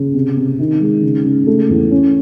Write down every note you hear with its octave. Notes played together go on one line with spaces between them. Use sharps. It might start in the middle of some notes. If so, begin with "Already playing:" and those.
Already playing: C#3
C3
C3
D#3
G#3
C#3
C#3
A3
E2
C#4